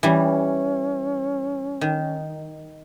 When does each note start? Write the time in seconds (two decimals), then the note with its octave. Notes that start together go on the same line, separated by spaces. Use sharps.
0.03 E3 G3 C#4
1.81 D#3